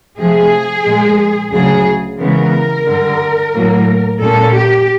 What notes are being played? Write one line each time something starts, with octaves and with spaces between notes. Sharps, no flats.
C3 F3 A3 G#4
A#2 F3 G#3
D2 C#3 F#3 G#4
C#3 E3 G#3 B3 A#4
G2 D3 G3
A2 F#3 A#3
A#2 G3 A#3 C#4 A4
G4